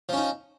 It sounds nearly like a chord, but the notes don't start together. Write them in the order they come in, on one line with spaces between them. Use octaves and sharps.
F3 C#4 D#4